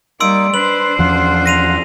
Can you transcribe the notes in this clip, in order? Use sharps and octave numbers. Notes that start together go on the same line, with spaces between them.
G3 A#3 D#4 D5 C6 D6 E6 D7
D4 B4 C5 F#7
E2 F3 C#4 F4 F#5
A#6 D#7 F7